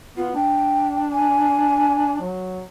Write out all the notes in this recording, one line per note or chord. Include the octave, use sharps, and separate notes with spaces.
B3 F4
D4 G5
G#5
F#3